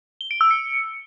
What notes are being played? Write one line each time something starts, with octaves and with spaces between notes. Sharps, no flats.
G7
D7
E6
C#7